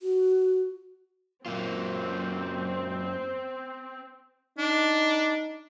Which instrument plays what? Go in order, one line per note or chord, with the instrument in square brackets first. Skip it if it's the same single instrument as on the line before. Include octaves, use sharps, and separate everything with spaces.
[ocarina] F#4
[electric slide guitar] F#2 A#3 F4 [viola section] C4
[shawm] D4 [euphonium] D#4